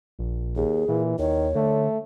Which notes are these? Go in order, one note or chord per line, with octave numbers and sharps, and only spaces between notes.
A#1
D#2 G#4
A#2 E3
D#2 D#3 C#5
D3 A3